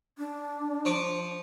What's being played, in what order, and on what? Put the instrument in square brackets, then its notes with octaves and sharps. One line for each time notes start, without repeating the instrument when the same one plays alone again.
[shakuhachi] D4
[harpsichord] F3 C#6 D6